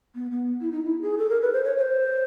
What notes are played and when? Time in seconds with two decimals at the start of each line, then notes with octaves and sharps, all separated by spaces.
0.15 B3
0.31 B3
0.61 E4
0.72 D#4
0.84 E4
1.02 G#4
1.18 A4
1.30 A#4
1.42 B4
1.53 C5
1.64 C#5
1.77 C#5
1.81 C5